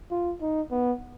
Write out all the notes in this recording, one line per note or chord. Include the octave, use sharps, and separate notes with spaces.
F4
D#4
B3